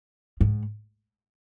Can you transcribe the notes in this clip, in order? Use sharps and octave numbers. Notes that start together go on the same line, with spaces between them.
G#2